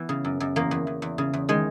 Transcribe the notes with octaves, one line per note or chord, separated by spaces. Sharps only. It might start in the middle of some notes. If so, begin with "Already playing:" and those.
Already playing: E3 B3
C#3
F#2
F#2
E2 A#3
E2
E2
E2
C#3
E2
D#3 G#3